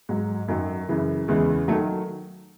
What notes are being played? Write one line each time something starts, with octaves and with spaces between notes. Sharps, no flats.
G#2 F#3
F#2 D#3 F#3
F#2 C#3 E3
E2 C#3 E3 G#3
D#3 F#3 A3